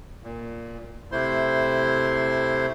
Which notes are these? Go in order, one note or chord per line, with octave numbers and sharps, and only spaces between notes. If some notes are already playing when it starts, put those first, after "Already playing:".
A#2
C3 A3 E4 C5 C6